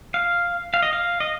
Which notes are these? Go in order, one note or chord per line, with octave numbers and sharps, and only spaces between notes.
F5
F5
D#5
F5
D#5